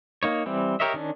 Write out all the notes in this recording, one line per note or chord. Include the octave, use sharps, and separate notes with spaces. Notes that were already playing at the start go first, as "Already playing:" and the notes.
A#3 D#4 C#5
E3 G3 C4
G4 A#4 C#5 D#5 E5
D#3 C#4 D4